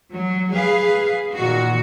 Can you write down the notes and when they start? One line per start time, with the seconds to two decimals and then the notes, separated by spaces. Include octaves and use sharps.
0.14 F#3
0.53 G#4 B4 F5
1.36 A#2 D#3 F#4